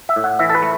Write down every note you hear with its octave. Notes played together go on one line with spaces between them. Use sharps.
E5
A2
F#5
E3 E5
A4
B4
A3